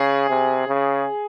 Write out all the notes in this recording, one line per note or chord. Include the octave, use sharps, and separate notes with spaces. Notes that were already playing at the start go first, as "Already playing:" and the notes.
Already playing: C#3 G#4
C3
C#3